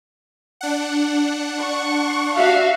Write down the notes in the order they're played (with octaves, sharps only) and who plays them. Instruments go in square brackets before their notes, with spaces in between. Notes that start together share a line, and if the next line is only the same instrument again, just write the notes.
[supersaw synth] D4 F#5
[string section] C#6
F#4 E5 F5